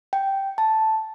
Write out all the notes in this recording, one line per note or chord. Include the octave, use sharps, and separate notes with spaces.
G5
A5